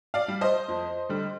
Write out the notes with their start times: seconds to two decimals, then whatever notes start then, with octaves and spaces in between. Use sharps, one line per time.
0.14 D5 F5
0.28 G3
0.41 C5 D#5
0.68 F2
1.09 D3 G3